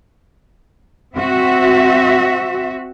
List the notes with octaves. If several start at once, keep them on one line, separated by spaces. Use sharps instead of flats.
C4 F#4 E5